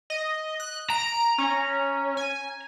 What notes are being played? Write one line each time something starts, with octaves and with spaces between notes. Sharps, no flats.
D#5
F#6
A#5 D7
C#4
G#5